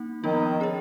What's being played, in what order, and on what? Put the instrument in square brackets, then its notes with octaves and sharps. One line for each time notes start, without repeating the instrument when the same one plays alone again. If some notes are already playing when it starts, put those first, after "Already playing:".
Already playing: [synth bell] A#3 D#4
[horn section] D#3 [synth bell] F3 B3 D#4
[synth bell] C#4 G#4 C#5